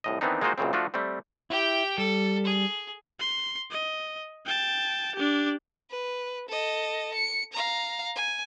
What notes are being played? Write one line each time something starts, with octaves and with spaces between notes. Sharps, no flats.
C2 A2 D#5
D#3 E3 B3 C4 D4 D#4
G#3 A#3 D#4 F4 F#4 C5
C#2 F#2 A#2 C#3 C4
F3 A3 D4 F4 F#4
G3 A3 C4
E4 G4 G5
G3 A4
G#4
C6
D#5
G5 A5
D4 G4
B4
A4 D#5
C#7
F5 A#5
G#5